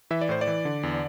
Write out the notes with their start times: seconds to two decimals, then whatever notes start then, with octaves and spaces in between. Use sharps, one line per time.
0.11 E3 E5
0.21 D5
0.29 A2 C5
0.41 D5
0.47 E3
0.65 D3
0.83 E2